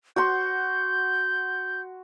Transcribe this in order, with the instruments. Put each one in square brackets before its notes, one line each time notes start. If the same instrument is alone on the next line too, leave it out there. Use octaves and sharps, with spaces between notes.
[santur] F#4 F#5 C6 [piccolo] G6